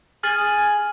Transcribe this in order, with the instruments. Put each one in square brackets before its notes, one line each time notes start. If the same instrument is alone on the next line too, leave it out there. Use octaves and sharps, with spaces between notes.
[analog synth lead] G#4 [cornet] G#5 [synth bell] F6 A6 F#7